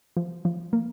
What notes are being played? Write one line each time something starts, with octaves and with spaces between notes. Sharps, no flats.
F3
F3
A#3